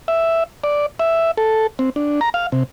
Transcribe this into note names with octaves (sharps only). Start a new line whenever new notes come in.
E5
D5
E5
A4
C4
D4
A#5
F5
C3